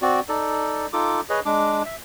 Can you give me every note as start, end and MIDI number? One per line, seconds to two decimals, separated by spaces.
0.02 0.20 60
0.02 0.20 66
0.02 0.20 74
0.29 0.87 63
0.29 0.87 69
0.29 0.87 74
0.93 1.21 63
0.93 1.21 65
0.93 1.21 69
0.93 1.21 86
1.30 1.40 68
1.30 1.40 71
1.30 1.40 73
1.30 1.40 75
1.45 1.83 56
1.45 1.83 62
1.45 1.83 86
1.85 1.96 76